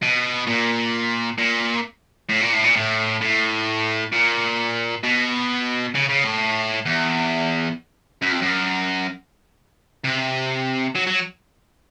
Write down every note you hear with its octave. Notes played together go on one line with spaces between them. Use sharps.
B2
A#2
A#2
A2
A#2
A2
A#2
A2
A2
A#2
B2
C#3
C#3
A2
E2
F#2
F2
F#2
C3
F#3
F#3